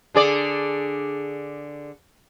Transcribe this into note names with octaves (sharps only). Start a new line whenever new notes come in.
D3 G#4 D5